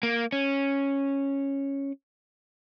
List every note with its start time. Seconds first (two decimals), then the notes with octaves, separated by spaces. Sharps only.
0.03 A#3
0.32 C#4